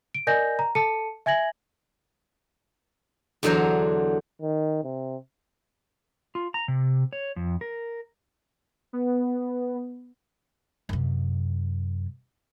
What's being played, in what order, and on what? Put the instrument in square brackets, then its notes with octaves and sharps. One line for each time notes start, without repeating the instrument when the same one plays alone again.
[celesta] D7
A#4 D5 D#5 G#5 G6 A#6
A#5
A4 A5 C#7 D#7
E5 G#5 G#6 A#6 F#7
[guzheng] E2 D3 F#3 D4 C5 A#5
[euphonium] D#3
C3
[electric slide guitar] F4
A#5
C3
C#5
F2
A#4
[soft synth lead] B3
[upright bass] F#2 C3